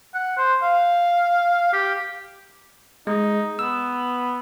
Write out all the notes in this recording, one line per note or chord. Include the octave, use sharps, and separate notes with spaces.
F#5
C5
F5
G4
G#3 D#4
B3 E6